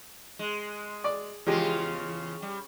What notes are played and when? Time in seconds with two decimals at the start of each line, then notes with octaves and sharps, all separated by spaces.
0.39 G#3
1.04 D5
1.47 E2 C#3 F3 G#3 F4 G4
2.42 G3